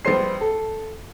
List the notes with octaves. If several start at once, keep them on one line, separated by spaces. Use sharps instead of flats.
A#1 G3 B4 C5 C7
A4